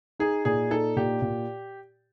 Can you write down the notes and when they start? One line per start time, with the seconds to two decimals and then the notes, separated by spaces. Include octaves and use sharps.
0.19 D#4 G#4
0.45 A#2 G#4
0.71 D#4 A4
0.96 A#2 G4
1.22 A#2